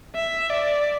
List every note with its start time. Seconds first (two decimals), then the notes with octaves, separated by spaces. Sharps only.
0.15 E5
0.50 D5